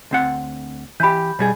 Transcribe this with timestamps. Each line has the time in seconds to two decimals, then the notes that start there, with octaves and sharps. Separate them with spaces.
0.11 D2 C4 F#5
1.00 E3 G4 B5 G6
1.39 B2 G3 G#4